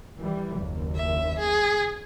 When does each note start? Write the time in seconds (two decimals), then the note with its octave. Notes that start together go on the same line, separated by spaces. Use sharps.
0.20 E3 G3
0.59 F#1 D#2
0.95 E5
1.39 G#4